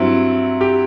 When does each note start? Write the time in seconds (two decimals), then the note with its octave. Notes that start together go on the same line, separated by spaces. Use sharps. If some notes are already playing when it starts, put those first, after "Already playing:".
Already playing: G2 F#3 C4 E4
0.61 G4